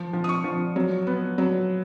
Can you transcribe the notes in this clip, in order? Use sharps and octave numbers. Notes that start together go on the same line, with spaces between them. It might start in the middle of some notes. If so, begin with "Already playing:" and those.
Already playing: F3
F3
D#6
C#6
F3
F#3
B3
F#3